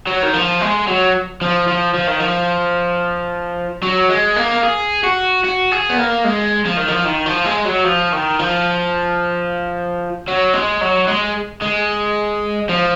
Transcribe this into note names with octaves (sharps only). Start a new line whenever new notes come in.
F#3
D#3
F3
G#3
F#3
F3
F3
F3
D#3
F3
F#3
G#3
A#3
G#4
F#4
F#4
G#4
B3
A#3
G#3
F3
D#3
F3
D#3
F3
G#3
F#3
F3
D#3
F3
F#3
G#3
F#3
G#3
G#3
F3